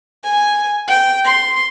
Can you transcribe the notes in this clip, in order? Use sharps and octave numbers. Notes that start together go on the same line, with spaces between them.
G#5
G5
C6